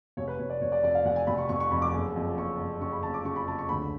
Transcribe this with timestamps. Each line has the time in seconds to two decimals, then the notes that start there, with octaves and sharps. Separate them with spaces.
0.17 F1 C#5
0.28 B4
0.39 F1 C#5
0.50 D5
0.61 F1 C#5
0.72 D5
0.83 F2 D5
0.95 F5
1.05 F1 F#5
1.16 G#5
1.27 F1 B5
1.38 C#6
1.49 F1 C#6
1.60 C#6
1.71 F2 B5
1.82 D6
1.93 F#1
2.16 F2
2.37 F#1 C#6
2.60 F#1
2.81 C#3 C#6
2.92 B5
3.03 F#1 A5
3.14 D6
3.25 C#3 C#6
3.36 B5
3.47 F#1 A5
3.59 C#6
3.69 D2 B5